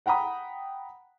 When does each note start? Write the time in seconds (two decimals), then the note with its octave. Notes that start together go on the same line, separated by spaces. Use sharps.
0.06 F#5 G5 A#5 B5 D#6